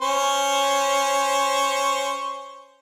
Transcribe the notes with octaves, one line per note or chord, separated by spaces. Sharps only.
C#4 C5 C#6